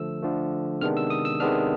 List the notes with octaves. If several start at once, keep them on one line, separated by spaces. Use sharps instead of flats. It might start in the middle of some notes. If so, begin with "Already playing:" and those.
Already playing: D3 F3 A3 E6
D3 F3 A3
C3 D#3 G#3 B3 D4 F6
E6
D#6
E6
C3 D#3 G#3 B3 D4 F6